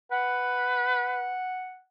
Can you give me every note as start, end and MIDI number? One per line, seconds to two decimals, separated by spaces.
0.12 1.37 71
0.12 1.80 78